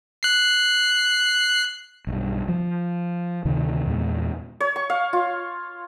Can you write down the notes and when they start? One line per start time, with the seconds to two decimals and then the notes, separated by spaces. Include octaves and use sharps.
0.23 F#6 C7
2.07 B1 G2
2.48 F3
3.45 D2 C3 D#3
3.87 E2 A#2 G#3 B3
4.60 C#5
4.76 C#6
4.90 F5
5.13 F4